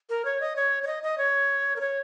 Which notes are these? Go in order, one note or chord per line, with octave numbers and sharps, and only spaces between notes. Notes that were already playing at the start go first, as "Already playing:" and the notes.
A#4
C#5
D#5
C#5
C#5
D#5
D#5
C#5
A#4
C#5